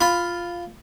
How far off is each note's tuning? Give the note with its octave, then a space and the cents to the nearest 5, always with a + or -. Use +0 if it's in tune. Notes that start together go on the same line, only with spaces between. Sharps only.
F4 +0 B5 +10